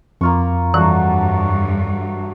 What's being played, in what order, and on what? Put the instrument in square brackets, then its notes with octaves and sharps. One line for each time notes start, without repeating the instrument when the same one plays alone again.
[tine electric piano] F2 [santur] A#3 F4 C#6
[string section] G2 [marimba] E3 [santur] F#3 A3 F#4